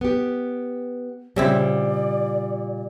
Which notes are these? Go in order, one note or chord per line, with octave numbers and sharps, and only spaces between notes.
B3 G4
A#2 C#3 G3 C4 E4 D5